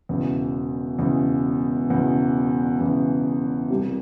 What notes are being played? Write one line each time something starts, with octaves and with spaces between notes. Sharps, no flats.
E1 E2 C#3
E1 E2 C#3
E1 E2 C#3
E1 E2 C#3
C2 C3 G3